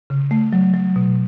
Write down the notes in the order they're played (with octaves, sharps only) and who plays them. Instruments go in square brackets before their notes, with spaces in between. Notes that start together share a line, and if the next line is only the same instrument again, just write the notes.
[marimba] C#3
A3
F#3
F#3
B2